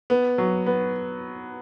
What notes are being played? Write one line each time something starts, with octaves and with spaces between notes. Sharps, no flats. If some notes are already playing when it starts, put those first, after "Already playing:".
B3
F#3
B3